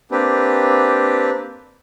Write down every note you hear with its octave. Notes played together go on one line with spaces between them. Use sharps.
A#3 C4 D4 G4 B4